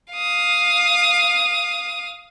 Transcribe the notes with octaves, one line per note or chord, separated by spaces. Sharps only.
F5 D#6